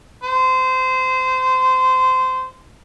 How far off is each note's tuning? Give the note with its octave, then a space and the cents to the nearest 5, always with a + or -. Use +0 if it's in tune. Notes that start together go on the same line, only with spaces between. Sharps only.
C5 -20